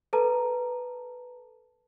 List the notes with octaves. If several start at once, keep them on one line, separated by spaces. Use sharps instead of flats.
A4 B4 A5 A#5